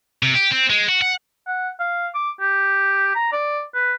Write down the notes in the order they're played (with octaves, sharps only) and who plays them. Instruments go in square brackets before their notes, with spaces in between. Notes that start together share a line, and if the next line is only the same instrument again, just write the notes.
[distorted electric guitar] C3
G4
C4
G#3
F#4
F#5
[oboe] F#5
F5
D6
G4
A#5
D5
B4